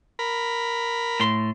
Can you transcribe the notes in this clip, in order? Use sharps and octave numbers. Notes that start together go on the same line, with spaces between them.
A#4 B5
A2 C6